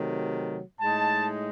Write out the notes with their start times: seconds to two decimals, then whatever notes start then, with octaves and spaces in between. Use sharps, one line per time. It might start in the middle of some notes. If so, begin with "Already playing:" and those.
Already playing: C3 D#3 F#3 A3
0.80 A2 G#3 D#4 A5